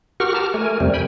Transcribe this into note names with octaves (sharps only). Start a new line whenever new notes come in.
F#4 G4 A#4 F#5 C#6 F6
G4 A5 A#5 F6
A3 A#4 G#5
F2 C3 G3 C4
G5 G#5 B5